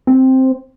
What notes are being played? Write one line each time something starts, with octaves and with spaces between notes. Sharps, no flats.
C4